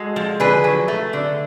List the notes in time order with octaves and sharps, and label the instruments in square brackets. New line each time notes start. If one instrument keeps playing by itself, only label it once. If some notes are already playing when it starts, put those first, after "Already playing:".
Already playing: [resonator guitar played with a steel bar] G#3 F#4 A4
F3
D3 G#4 B4
F#3
A3
D3